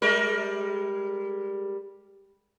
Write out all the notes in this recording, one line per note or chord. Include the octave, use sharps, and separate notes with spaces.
G3 G#3 A#4